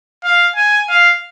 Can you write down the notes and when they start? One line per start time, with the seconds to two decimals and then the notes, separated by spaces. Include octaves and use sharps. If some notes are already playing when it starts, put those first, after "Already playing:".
0.24 F5
0.56 G#5
0.89 F5